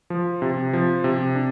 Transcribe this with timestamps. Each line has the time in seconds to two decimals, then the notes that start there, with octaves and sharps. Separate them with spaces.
0.10 F3
0.42 C3
0.73 F3
1.04 C3
1.35 D4